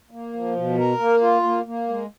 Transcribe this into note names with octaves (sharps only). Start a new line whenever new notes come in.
A#3
F3
B2
A#4
A#3
F4
A#3
A#3
G#3